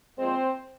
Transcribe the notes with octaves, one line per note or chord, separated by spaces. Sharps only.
A#2 F3 G#3 C4 C5